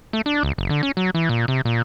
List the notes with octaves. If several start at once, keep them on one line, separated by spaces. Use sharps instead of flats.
A3
D4
C#2
F#1
D3
C#4
F#3
E3
A#2
C3
A#2